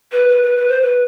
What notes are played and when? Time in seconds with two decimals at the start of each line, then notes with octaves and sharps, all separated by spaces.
0.12 B4
0.29 B4
0.43 B4
0.56 B4
0.68 C5
0.82 B4